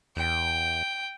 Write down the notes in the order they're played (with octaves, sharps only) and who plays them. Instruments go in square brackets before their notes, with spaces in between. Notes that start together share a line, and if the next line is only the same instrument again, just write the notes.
[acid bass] E2 [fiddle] G5